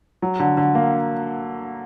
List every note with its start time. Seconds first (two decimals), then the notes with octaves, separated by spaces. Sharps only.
0.22 F#3
0.40 D3
0.57 D3
0.75 A#3